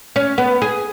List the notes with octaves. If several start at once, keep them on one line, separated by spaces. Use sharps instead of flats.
C#4
B3
G#4